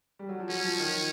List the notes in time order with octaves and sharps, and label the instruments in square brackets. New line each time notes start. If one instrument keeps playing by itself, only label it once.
[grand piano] G3
F#3
F3
[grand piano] F#3 [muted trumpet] C#4
[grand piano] F3
D#3